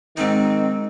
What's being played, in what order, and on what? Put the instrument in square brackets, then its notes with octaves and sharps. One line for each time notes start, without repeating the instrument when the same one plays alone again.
[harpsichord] G#2 D#4 [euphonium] D#3 [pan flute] C4